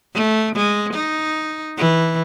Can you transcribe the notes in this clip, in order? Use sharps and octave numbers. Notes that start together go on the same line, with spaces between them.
A3
G#3
D#4
E3